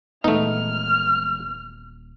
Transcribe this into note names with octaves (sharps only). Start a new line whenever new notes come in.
D#1 E3 G#3 A3 B3 D#4 F6